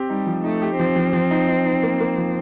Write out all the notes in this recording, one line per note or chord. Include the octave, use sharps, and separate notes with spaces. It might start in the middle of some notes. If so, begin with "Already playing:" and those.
Already playing: C4 G4
G3 D#4
F3
A3 D#4
G4
F3 C4
F3
F3
D#4
D#4
D#4
A#3
A#3
F3